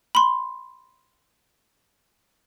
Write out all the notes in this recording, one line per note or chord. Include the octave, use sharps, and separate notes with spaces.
B5 C6